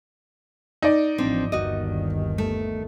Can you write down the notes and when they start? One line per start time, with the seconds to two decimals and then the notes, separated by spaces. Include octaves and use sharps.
0.82 D#4 D5
1.18 A1 F3 C4 D4
1.52 G1 D#2 D#3 F#4 D#5
2.38 A3